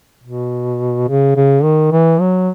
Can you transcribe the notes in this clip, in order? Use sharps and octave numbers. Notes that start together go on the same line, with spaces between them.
B2
C#3
C#3
D#3
E3
F#3